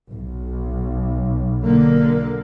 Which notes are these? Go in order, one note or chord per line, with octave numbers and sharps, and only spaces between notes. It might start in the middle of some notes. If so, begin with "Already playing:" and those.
B1
D3 A#3